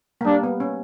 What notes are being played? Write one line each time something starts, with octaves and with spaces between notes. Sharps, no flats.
A#3
G3 D4
B3
C#4